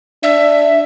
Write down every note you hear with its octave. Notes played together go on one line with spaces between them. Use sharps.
D4 E5